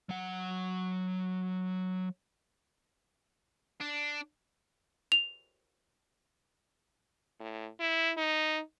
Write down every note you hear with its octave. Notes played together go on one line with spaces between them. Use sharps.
F#3 F#5
D4
F7
A2
E4
D#4